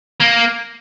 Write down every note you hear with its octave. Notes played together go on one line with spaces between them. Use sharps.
A#3